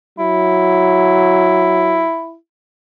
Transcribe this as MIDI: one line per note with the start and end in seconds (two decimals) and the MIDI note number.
0.19 2.06 54
0.19 2.35 64